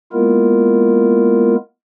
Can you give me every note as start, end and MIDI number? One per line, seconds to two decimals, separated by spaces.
0.13 1.56 56
0.13 1.56 58
0.13 1.56 59
0.13 1.56 64
0.13 1.56 65
0.13 1.56 70